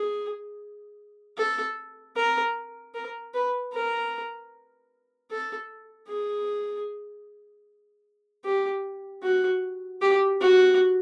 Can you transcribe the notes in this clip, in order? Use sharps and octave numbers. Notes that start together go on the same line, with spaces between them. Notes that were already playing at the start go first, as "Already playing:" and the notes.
Already playing: G#4
A4
A#4
A#4
B4
A#4
A4
G#4
G4
F#4
G4
F#4